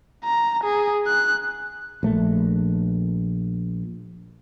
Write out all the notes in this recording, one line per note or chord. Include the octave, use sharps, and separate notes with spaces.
A#5
G#4
F#6
A#1 A3